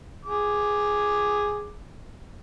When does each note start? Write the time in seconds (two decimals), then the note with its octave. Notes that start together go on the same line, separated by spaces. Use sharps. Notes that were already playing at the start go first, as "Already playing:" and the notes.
0.25 G#4 D6